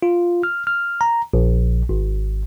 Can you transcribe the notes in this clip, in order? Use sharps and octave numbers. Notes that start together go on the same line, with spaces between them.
F4
F6
F6
A#5
A#1
G#1